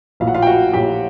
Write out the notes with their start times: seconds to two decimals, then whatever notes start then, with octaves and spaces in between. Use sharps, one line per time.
0.20 A#1 A2 F#3 F5
0.27 F#5
0.34 F4 F5
0.43 G5
0.47 F#4 F#5
0.73 A#1 A2 F#3 G4 G5